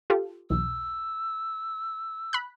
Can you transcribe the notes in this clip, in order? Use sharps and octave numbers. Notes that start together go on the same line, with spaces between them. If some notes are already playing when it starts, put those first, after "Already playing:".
F4 G4 A4
B1 E2 E6
B5 F#6